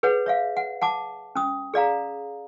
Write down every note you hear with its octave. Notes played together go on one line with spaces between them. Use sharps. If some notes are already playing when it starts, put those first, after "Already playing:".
G#4 B4 C#5 F#5
C#5 E5 F5
F#5
F#5 A5 D6
C#4 D#6
G#4 D5 F5 A#5